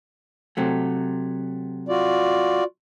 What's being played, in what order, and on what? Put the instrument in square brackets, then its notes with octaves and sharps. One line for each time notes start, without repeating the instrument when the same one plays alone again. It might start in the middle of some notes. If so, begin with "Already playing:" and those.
[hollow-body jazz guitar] C3 F#3 A3
[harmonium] F4 F#4 D5